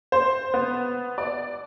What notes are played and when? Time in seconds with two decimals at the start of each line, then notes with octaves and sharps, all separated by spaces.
0.12 C5
0.54 B3
1.18 D5